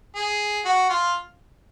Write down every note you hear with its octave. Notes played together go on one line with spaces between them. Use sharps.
G#4
F#4
F4